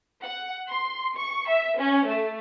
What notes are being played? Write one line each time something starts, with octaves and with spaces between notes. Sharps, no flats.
F#5
C6
C#6
E5
C#4
A3